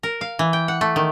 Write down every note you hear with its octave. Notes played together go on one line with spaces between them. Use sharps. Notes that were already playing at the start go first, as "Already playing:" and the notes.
A#4
F5
E3
G5
F#5
A3
D#3